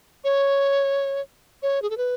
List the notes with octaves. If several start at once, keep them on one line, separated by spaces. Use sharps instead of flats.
C#5
C#5
G#4
A4
B4